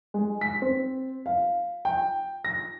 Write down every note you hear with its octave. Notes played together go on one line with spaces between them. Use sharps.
G#3
B6
C4
F5
G5
A#6